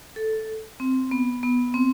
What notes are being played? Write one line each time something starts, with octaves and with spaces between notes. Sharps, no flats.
A4
C4
B3
B3
C4